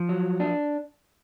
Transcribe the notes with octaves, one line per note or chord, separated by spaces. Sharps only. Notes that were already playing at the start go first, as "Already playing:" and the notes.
Already playing: F3
F#3
D4